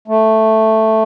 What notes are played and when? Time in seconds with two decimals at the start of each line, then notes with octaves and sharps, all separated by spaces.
0.08 A3